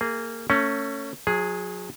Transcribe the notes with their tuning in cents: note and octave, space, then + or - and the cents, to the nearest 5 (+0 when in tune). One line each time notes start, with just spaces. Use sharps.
A#3 -20 G#4 +0
A3 +35 C#4 +0
F#3 -35 G#4 +0